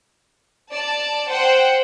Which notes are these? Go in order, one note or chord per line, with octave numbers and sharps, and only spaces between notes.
D5 A5
C5 F#5 G5